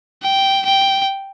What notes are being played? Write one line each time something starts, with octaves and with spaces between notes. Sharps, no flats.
G5
G5